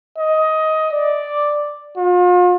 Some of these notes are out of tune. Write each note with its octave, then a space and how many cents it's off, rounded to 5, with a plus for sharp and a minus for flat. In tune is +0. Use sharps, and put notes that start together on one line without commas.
D#5 +15
D5 +0
F4 +40